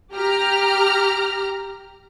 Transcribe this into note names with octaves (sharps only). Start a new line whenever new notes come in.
G4 A#5 F6